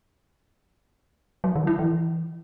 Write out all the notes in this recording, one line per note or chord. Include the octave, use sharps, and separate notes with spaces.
F#3
D#3
E4
E3